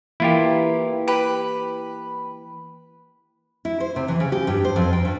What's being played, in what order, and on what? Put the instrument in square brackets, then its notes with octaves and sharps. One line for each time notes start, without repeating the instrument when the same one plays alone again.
[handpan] E3 A#3 [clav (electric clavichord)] E4 F4 G4
[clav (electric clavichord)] G4 [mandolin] B4
[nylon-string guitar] E4
C5
C3
E3
C#3
G4
G2
C5
F2
G5
G2